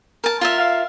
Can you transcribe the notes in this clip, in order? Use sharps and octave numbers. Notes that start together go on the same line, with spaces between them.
A#4 A5
F4 A#4 E5
F5